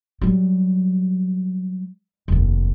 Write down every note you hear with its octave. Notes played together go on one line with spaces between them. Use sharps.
F#3 G3
F1 D#2